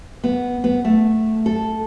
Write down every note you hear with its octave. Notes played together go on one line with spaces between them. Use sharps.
B3
B3
A3
A4